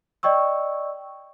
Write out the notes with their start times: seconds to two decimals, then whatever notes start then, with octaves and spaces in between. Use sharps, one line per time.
0.23 D5 D#5 G5 C#6 E6